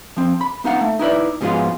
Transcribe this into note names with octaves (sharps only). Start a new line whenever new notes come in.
F3 C4
B5
B3 D#4 F5 F#5
A3
D#4 E4 B4 D5
G#2 B2 F3 G#3 B3 F4